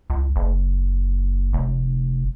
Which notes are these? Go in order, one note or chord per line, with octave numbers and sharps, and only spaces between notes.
C#2
F#1
F1